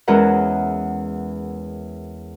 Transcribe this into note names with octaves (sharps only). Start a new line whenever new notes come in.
E2 E3 G#3 C#4 A#4 F#5